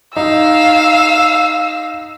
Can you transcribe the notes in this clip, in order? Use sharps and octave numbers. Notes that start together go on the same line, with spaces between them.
D#4 F5 E6